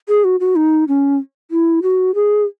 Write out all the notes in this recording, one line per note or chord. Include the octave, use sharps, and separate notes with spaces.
G#4
F#4
F#4
D#4
C#4
E4
F#4
G#4